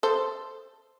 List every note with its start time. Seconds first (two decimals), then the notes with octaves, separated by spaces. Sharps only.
0.03 A4 C5